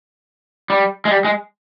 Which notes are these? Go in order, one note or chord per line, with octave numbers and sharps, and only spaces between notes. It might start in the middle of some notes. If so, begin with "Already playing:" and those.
G3
G#3
G3
G#3